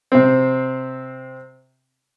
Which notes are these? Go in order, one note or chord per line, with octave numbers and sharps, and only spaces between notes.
C3 C4